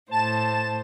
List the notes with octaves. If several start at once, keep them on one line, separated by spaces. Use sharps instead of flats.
A2 C5 A5 E7